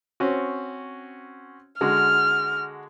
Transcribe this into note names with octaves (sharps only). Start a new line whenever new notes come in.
C4 C#4 F#4
D3 G#3 F#4 F6